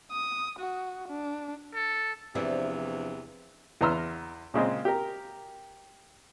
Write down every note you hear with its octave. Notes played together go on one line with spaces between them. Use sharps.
D#6
F#4
D4
A4
E2 C3 E3 F3 D4 E4
E2 B4 A#5 C6 E6 F6
A#2 C#3 G#3 C4
G4 A#4